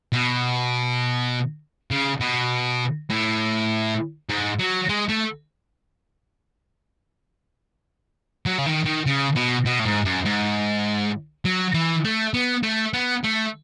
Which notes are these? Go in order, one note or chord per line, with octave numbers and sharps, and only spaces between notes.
B2
C#3
B2
A2
G#2
F#3
G#3
A3
F#3
C#3
D#3
D#3
C#3
B2
B2
A2
G#2
F#2
G#2
F#3
E3
A3
B3
A3
B3
A3